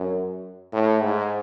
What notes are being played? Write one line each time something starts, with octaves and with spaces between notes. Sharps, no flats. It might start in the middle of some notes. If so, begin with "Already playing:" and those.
Already playing: F#2
A2
G#2